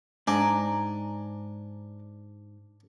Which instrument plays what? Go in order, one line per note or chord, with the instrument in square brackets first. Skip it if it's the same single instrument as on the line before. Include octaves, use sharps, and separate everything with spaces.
[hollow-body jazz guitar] G#2 [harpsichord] D4 [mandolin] D5 G#5 A#5